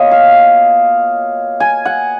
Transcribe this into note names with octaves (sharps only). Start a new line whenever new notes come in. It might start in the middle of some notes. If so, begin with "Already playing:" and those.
Already playing: B2 A#3 F4 C#5 D#5
F5
G#5
F#5